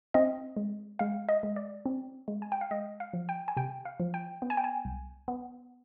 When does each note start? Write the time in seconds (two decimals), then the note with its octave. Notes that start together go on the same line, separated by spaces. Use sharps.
0.14 C4 D#5
0.57 G#3
0.99 G#3 F5
1.29 D#5
1.43 G#3
1.56 D5
1.86 C4
2.28 G#3
2.42 G#5
2.52 G5
2.61 F5
2.71 G#3 D#5
3.00 F5
3.13 F3
3.29 G5
3.48 G#5
3.57 C3 G5
3.85 F5
4.00 F3
4.14 G5
4.42 B3
4.50 G#5
4.57 G5
4.64 G#5
4.85 C2
5.28 B3